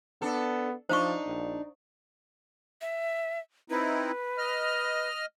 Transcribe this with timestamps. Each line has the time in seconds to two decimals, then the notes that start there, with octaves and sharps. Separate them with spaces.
0.22 B3 D4 A4
0.89 F3 D4 D#4 C5 F5 C#6
1.26 A#1
2.81 E5
3.70 C4 D#4 E4 B4
4.38 D#5 F6